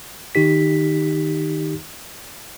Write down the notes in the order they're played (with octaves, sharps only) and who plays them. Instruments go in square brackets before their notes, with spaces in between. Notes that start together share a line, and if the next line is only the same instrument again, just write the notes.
[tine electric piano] D#3 D#4 G4 B6